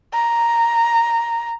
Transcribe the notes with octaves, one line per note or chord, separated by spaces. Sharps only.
A#5